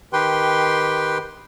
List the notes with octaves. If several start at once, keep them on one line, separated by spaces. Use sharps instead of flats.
D#3 G4 B4 G5 C6